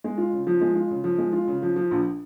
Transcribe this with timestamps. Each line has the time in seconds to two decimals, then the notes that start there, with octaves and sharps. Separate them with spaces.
0.04 G#3
0.18 F4
0.33 C#3
0.47 F3
0.61 G#3
0.75 F4
0.91 C#3
1.04 F3
1.18 G#3
1.33 F4
1.48 C#3
1.62 F3
1.76 F3
1.91 A#1